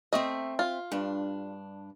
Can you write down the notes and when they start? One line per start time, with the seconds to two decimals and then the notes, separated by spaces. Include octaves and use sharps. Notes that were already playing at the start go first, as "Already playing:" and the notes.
0.13 A3 C4 D#5 E5
0.59 F4
0.92 G2 D4